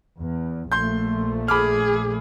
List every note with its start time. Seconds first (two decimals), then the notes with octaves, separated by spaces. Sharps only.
0.21 E2
0.72 A#1 F3 A3 C6 G6
1.48 G#4 B5 D6 F6